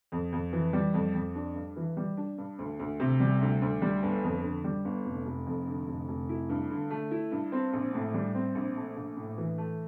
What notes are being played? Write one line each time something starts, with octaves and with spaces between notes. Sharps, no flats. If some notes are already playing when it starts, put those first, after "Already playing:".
F2
F2
E3
G3
F2
F2
D4
G2
E3
G3
D4
G2
D2
D2
C3
G3
D2
D2
G3
G1
F2
D3
G3
G1
F1
F1
F2
D3
F1
F1
E4
G2
D3
A3
E4
G2
C4
A#1
A2
G3
C4
A#1
A3
A#1
A2
E3
A3